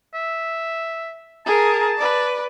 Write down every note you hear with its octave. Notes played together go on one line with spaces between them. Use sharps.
E5
G#4 A#4 A5
B4 D5